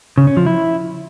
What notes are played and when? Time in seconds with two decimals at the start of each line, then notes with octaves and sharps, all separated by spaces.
0.18 C#3
0.27 C#4
0.37 F3
0.46 E4